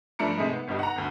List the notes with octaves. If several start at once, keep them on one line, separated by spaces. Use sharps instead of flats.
G2 F3 A3 D4 A#5 C#7
C3 G#3 A3 D#4
B3
G1 G2 D#4 G4
F#5 A#5
G1 D2